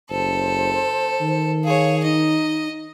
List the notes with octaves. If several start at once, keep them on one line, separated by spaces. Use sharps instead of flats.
F#1 A4 C5
D#3
G#4 C#5 F5
D#4 D#5